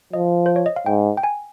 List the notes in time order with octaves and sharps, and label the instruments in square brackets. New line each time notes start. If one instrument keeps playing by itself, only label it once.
[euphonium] F3 [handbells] D#5
[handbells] C5
C#5
D#5
F5
[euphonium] G#2 [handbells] G5
[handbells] G5
G#5